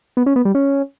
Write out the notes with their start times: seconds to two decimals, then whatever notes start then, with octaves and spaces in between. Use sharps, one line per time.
0.17 B3
0.26 C#4
0.36 B3
0.45 G3
0.55 C#4